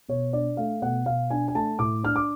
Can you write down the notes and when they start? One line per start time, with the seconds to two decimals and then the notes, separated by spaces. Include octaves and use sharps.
0.09 B2 C#5
0.33 D4 D5
0.57 A3 F5
0.82 B2 F#5
1.06 B2 F5
1.30 D4 G#5
1.48 G#5
1.55 A3 A5
1.79 A2 D6
2.04 D4 F6
2.16 D6